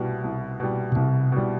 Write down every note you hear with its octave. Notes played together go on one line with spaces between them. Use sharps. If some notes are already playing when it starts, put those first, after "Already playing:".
Already playing: C2 B2 G3
C2
B2 G3
B2
C2 C3
B2 G3